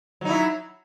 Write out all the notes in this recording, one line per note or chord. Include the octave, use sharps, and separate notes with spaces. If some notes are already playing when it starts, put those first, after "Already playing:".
F#3 D#4 E4